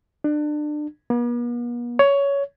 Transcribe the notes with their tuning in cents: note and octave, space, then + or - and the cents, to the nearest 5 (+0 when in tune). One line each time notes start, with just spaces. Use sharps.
D4 +30
B3 -45
C#5 +15